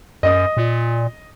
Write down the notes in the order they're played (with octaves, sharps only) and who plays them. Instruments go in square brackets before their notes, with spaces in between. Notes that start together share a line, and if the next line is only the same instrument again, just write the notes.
[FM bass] F#2 [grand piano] D#5 D#6
[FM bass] A#2